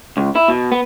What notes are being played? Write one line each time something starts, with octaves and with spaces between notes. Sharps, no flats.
C#2
E4
B2
B3